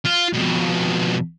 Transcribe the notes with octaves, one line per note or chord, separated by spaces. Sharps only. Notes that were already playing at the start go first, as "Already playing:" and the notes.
F4
F2 B2